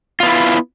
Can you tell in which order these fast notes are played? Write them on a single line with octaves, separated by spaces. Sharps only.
F4 B3 E4